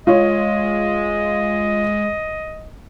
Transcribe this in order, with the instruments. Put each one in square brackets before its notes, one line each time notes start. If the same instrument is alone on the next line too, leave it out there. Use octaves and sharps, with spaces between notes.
[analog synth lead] G#3 [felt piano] F4 C#5 [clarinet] D#5